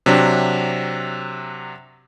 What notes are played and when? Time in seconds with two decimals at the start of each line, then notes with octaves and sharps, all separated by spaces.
0.06 C3 F#3 D4